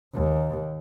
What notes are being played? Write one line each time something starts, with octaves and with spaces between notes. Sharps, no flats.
D#2